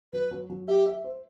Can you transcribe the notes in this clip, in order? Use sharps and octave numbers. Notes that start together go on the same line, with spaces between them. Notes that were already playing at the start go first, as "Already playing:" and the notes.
F#3 B4
F#3
F#3
G4 E5
E5
C5